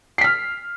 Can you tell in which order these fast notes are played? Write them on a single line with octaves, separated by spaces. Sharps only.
C7 B6 F6